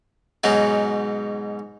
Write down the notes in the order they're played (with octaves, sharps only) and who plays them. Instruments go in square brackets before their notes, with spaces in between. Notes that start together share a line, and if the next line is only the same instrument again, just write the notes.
[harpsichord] G#2 B2 F#3 C#4 D#4